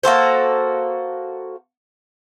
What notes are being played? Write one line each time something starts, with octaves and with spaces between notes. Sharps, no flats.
A#3 F#4 A4 C5